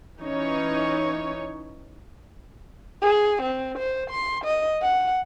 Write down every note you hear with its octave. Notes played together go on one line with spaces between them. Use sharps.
E3 C#4 D#4 C#5
G#4
C4
C5
C6
D#5
F#5